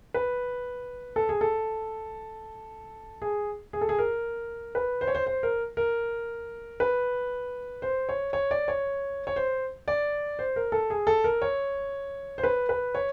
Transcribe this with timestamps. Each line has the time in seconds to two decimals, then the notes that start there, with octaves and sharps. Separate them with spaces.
0.14 B4
1.16 A4
1.29 G#4
1.41 A4
3.22 G#4
3.73 G#4
3.81 A4
3.89 G#4
3.99 A#4
4.75 B4
5.01 C5
5.08 C#5
5.15 C5
5.26 C5
5.43 A#4
5.77 A#4
6.80 B4
7.82 C5
8.09 C#5
8.33 C#5
8.51 D5
8.68 C#5
9.27 C#5
9.36 C5
9.88 D5
10.39 C5
10.56 A#4
10.72 A4
10.90 G#4
11.07 A4
11.24 A#4
11.42 C#5
12.38 C5
12.43 B4
12.69 B4
12.95 C#5